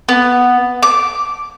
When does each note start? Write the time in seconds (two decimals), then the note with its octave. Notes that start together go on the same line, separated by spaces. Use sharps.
0.09 B3
0.83 D6